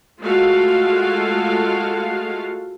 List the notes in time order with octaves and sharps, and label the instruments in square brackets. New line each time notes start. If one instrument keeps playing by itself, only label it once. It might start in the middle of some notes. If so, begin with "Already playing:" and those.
[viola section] G#3 A3 F4 F#4 A4 F5